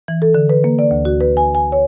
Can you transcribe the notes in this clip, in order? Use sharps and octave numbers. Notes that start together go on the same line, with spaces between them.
E3
A4
D3
B4
A#3
D5
D2
F#4
B4
G#5
G#5
C#5